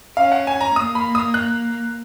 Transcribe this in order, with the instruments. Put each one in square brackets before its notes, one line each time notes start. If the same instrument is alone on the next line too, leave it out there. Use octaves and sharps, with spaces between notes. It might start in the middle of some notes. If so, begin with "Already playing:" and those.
[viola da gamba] C#4 [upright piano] F5
[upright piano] F#5
G#5
A#5
[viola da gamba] A#3 [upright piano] D#6
[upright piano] B5
D#6
F#6